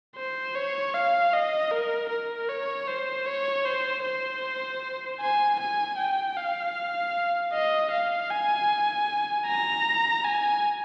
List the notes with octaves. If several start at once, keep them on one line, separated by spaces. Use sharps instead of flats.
C5
C#5
F5
D#5
A#4
A#4
C#5
C5
C#5
C5
C5
G#5
G#5
G5
F5
D#5
F5
G#5
A#5
G#5